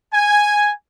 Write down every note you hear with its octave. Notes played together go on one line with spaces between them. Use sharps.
G#5